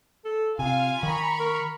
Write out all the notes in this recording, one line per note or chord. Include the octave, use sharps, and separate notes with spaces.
A4
C3 F4 F5 G#5
D#3 A#5 B5 C#6
A#4